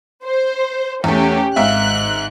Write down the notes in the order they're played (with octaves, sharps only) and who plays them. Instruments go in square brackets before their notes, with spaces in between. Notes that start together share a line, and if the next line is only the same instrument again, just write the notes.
[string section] C5
[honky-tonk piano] E2 A3 [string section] C#4 G4
[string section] G#1 F#6 [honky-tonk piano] G#2 E5 F5